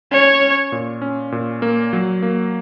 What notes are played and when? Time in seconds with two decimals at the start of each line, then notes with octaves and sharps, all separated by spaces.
0.11 C#4 C#5
0.41 C#4
0.72 A#2
1.02 C#4
1.32 A#2
1.62 A#3
1.93 F#3
2.22 A#3